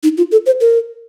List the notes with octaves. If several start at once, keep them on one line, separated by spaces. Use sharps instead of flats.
D#4
F4
A4
C5
A#4